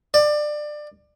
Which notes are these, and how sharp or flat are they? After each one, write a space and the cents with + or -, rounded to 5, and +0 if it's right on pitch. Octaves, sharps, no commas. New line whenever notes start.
D5 +25